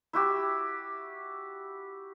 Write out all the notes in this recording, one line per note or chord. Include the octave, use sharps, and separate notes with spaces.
E4 F#4 G4